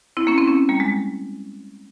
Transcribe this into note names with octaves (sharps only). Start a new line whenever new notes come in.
C4 E4
A#3 C#4
C4 E4
A#3 C#4
G3 A#3
G#3